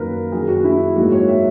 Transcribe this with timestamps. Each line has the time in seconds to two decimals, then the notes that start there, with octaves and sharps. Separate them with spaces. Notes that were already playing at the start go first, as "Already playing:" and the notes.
Already playing: F#2 D#3 A#3 A#4 B4
0.32 F#2 D#3 A#3 G#4
0.48 F#4
0.64 E4
0.96 G#2 F#3 A#3 F#4
1.12 C#5
1.27 E5